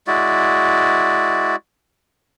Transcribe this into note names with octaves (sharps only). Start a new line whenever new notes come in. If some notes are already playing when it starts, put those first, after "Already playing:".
G#3 E4 F#4 D5